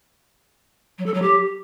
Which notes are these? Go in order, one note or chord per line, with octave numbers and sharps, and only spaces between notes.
F#3
A4
F#3
G4